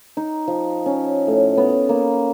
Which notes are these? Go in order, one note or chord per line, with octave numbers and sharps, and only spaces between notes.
D#4
F3
C#4
A2
B3
A#3